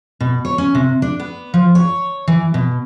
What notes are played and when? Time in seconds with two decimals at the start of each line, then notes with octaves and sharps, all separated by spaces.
0.20 B2
0.45 C#5
0.58 C#4
0.75 C3
1.02 D4
1.20 B3
1.54 F3
1.75 C#5
2.28 E3
2.54 B2